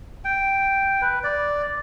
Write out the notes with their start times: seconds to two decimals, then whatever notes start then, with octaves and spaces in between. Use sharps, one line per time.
0.25 G5
1.02 B4
1.24 D5